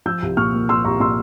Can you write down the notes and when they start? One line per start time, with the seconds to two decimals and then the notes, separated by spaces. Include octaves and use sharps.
0.06 F3 E6 G6
0.22 C2
0.37 A#2 C#6 F6
0.53 A#3
0.69 F3 C6 E6
0.85 C2 A#5 C#6
1.00 A#2 C6 E6